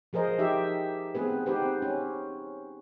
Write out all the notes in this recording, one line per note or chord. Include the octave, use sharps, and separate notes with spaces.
F3 G#4 A#4 C5 D#5
F3 D#4 G4 E5
B3 C4 G#4 B4
C4 D#4 G4 B4 C5
C#4